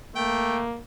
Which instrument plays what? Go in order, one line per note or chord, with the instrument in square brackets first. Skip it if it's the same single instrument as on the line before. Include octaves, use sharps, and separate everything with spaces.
[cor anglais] A3 [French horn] A#3 [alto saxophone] G5